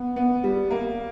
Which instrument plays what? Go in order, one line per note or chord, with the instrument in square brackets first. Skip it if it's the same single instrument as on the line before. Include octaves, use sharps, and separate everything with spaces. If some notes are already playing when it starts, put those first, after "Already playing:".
Already playing: [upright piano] B3
B3
G3
A#3